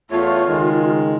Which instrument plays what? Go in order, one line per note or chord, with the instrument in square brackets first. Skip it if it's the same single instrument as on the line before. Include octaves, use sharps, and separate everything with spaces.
[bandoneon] E2 A3 C#5 [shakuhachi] F4
[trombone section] C#2 D#3 [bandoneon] G#3